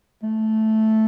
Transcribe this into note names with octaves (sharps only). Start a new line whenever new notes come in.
A3